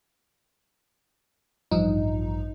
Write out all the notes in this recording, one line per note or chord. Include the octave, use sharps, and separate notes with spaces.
A1 G2 F3 D#4